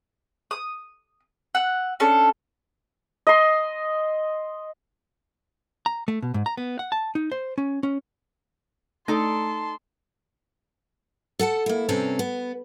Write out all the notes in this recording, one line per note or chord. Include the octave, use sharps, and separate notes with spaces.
D#6
F#5 E6
C#4 D4 A4
D#5 C6
A#5
A3
B2
G#2
A#5
B3
F#5
A5
D#4
C5
C#4
C#4
A3 D#4 A4 D5 A5 C6
A4 F#5 G#5 A5
A#3 E4
G2 C3 C4 C#4 A4 A#5
B3